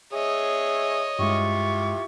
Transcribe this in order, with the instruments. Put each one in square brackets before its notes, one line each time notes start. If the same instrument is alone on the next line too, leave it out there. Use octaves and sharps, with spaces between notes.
[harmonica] G#4 E5 [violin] C#5 D#5
[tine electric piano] G2 G#3 [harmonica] E4 F4 G4 [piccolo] C#6